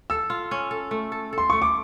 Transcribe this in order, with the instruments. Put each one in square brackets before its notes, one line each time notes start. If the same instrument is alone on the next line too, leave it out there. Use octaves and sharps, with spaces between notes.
[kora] A4 [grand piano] E6
[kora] F4
C#4
A4
A3
A4
A4
[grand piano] C6
[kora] A3 [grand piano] C#6
[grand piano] D6